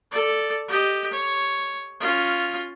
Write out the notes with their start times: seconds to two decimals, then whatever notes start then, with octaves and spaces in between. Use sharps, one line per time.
0.11 A4 D5
0.69 G4 D#5
1.11 C#5
2.01 C#4 F4